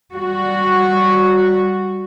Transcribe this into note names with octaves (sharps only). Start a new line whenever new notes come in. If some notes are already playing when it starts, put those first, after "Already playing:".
G3 F#4